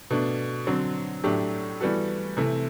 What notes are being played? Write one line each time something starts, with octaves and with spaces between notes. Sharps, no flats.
B2 A3 D4
D3 F#3 C4
A2 F#3 A3 D4 G4
E3 G3 B3 F#4 A4
C3 E3 A3 C4